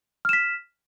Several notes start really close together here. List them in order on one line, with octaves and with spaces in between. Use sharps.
F6 E7 B6